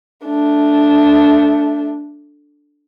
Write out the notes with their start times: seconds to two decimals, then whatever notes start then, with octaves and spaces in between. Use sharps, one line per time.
0.24 A3 D4